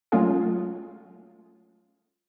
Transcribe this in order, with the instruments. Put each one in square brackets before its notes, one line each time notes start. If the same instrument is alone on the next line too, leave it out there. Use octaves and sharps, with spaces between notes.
[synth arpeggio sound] F#3 G#3 A3 C#4 F4 G#4